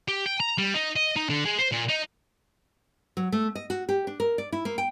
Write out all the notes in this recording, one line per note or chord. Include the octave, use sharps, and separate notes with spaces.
G4
G5
A#5
G3
D#4
D#5
D#4
D3
G#3
C5
A#2
D#4
F#3
A3
D#5
F#4
G4
D4
A#4
D5
E4
A#3
G5